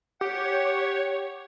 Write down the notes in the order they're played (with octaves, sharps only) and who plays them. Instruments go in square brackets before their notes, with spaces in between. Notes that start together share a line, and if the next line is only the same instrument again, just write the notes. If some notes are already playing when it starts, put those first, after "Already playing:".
[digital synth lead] G4 [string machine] C#5 [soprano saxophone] F#5